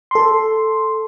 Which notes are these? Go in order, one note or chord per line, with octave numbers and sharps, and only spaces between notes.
A4 C6